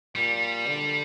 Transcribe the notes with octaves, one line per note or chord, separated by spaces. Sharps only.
A#2 G3
D3